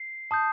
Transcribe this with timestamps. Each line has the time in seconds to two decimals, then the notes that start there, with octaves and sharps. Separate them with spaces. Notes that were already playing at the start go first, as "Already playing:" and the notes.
Already playing: C7
0.31 A5 D#6 G6